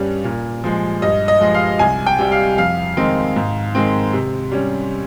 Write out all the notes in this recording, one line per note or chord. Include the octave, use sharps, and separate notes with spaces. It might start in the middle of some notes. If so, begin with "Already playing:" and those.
Already playing: G2 G3 C#4
A#2
F3 G#3
G2 D#5
D#5
F3 G#3
F5
C2 G#5
G5
C3 G3
F5
F2 F5
D#3 G#3 C4 D#4
G#2
D#3 G#3 C4
C3
G3 C#4